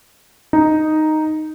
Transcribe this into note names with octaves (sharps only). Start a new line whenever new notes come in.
D#4